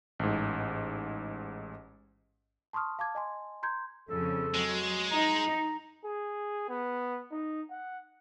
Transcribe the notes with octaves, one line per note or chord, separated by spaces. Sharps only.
A1 G#2
A5 C6 C#6 D#6 F6
F5 A5 D6 G#6
D#5 G#5 C6
A#5 C6 G6 G#6
F2 C#3 A4
F#3 G#3
D#4 A#5
G#4
B3
D#4
F#5